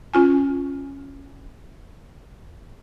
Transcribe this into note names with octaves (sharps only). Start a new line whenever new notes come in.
C#4 F4 G#5